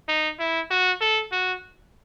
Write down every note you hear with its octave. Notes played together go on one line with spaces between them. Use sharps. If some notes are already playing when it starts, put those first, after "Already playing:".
D#4
E4
F#4
A4
F#4